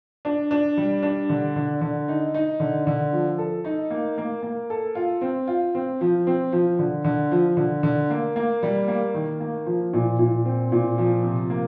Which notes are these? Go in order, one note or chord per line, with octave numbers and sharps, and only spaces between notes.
D4
D4
G3
D4
D3
D3
D3
D#4
D#4
D3
D3
F3
A4
D#4
A#3
A#3
A#3
A4
F4
C4
F4
C4
F3
C4
F3
D3
D3
F3
D3
D3
A#3
A#3
G3
A#3
D#3
A#3
F3
A#2
A#2
C4
A#2
F3
C3
A#3